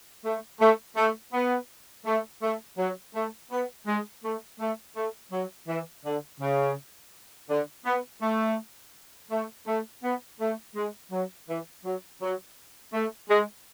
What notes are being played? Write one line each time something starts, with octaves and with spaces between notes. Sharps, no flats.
A3
A3
A3
B3
A3
A3
F#3
A3
B3
G#3
A3
A3
A3
F#3
E3
D3
C#3
D3
B3
A3
A3
A3
B3
A3
G#3
F#3
E3
F#3
F#3
A3
G#3